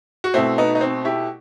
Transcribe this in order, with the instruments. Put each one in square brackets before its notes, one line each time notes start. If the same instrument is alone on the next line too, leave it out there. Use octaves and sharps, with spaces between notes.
[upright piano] F#4
B2 A3 C4 E4
B3 D#4
D#4
C4
E4 G4